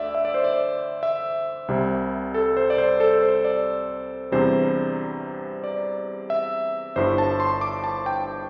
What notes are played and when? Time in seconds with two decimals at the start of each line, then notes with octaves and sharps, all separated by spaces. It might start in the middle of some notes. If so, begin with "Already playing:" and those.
Already playing: D2 D5 E5
0.15 E5
0.25 D5
0.34 C5
0.44 D5
1.03 E5
1.68 C2 C3 G3 C4
2.34 A4
2.57 C5
2.70 D5
2.78 C5
3.00 A4
3.23 C5
3.45 D5
4.32 E2 C3 E3 G3 D4 C5
5.64 D5
6.30 E5
6.96 G1 G2 G3 E4 C5
7.18 A5
7.40 C6
7.61 D6
7.84 A5
8.06 G5